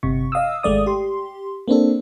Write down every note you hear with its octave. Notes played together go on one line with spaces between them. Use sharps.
G1 C3 C#6
D#5 F5 D#6 E6
G#1 G#3 A3 D5 D#6
G4 C6
A#3 C4 D4 A4